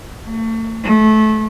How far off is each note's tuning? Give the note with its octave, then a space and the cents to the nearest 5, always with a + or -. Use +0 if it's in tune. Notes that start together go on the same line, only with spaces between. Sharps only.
A3 +40
A3 -25